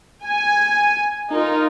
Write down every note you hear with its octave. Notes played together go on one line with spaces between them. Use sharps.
G#5
D#4 F4 A#4